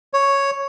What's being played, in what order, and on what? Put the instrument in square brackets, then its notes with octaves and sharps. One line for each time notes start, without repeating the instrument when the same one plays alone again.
[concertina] C#5